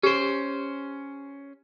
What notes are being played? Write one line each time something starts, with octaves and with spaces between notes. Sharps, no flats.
C#4 G4 C5